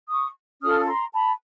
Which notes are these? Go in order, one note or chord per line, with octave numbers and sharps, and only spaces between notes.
C#6 D#6
C#4 F4 A4 D#6 F6
A#5 C6
A5 B5